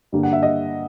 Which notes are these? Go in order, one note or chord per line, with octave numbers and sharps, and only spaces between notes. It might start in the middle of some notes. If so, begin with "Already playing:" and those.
G2 D3 G3 A#3
F#5
E5
D#5